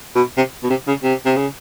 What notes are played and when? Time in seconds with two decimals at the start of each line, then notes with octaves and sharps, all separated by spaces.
0.15 B2
0.37 C3
0.64 B2
0.70 C3
0.88 C#3
1.03 C3
1.25 C3
1.37 C#3